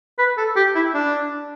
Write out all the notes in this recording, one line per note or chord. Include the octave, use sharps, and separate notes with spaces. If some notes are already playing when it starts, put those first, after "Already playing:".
B4
A4
G4
E4
D4